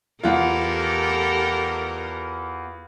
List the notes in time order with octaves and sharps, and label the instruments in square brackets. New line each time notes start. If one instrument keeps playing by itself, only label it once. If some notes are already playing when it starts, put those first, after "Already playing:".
[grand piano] E2 F4 [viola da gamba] G4 A4 A#4